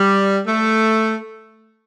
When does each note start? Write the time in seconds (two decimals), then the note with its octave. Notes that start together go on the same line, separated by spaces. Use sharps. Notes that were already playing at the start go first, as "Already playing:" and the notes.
Already playing: G3
0.46 A3